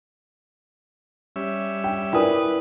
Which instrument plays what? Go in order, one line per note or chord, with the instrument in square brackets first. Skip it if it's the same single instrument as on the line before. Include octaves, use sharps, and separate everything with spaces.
[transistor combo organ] G3 C#4 E5
[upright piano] G5
[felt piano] E4 A#4 D5 [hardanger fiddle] B4 [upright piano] G5 G#5 D#6